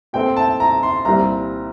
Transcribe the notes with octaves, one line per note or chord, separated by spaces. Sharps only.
A#2 A3 C4 G5
A5
A#5
C6
C2 A#2 G3 C4 A#5